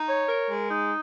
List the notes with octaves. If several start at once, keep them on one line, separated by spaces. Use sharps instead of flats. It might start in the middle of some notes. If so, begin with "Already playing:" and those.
Already playing: D#4
C#5
A#4
G#3
D#4